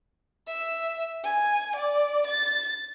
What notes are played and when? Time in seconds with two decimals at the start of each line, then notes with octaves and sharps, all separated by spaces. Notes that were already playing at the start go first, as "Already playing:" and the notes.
0.48 E5
1.24 G#5
1.76 D5
2.27 A6